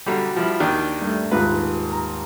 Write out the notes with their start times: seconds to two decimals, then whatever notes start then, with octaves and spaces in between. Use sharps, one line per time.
0.06 B1 D3 G3 F#4
0.36 F3 G3 E4
0.60 D#2 D#3 D4
1.02 G2 A3
1.31 D#1 G#2 F4 B4
1.92 A#5